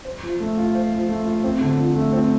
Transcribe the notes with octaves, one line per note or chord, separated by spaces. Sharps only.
C5
F3
A3
F4
C5
F3
A3
F4
C4
D3
F3
A3
C4